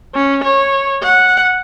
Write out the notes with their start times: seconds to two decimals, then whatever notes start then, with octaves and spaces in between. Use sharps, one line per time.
0.15 C#4
0.44 C#5
1.03 F#5